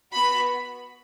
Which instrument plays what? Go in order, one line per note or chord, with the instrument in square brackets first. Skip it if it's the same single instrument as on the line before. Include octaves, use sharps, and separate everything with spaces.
[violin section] B3 F#4 B5